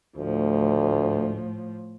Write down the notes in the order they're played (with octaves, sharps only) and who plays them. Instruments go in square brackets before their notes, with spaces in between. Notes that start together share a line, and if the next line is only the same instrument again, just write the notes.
[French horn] D2 [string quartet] A2 F3